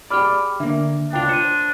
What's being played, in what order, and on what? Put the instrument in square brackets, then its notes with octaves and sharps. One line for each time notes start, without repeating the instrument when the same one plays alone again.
[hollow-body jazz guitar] G4 G#4 D5 [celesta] B5 D6 F6
[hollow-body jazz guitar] D3 A#3 [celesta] D4 E5
[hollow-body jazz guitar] C#2 F4 [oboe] D4 [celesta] G5
[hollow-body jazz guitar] C5 [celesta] C#7 D#7